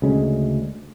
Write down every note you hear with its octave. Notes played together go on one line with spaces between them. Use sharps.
D2 C#3 G#3 C#4